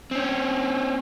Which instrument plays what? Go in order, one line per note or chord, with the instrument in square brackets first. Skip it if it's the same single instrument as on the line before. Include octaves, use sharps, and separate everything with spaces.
[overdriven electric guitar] C4 C#4